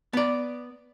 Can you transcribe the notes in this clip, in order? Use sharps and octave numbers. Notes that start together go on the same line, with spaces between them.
B3 D5